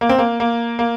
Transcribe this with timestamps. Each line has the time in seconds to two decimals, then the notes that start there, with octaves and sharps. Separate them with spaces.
0.01 A#3
0.09 C4
0.18 A#3
0.40 A#3
0.79 A#3